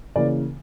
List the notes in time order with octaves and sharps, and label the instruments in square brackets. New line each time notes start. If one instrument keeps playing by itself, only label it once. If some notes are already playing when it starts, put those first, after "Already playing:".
[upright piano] C#3 E3 A#3 D5